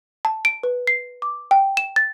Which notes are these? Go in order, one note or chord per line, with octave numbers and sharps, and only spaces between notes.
A5
D7
B4
C7
D6
G5
E7
A6